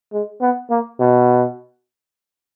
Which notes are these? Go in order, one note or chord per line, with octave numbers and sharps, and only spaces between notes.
G#3
B3
A#3
B2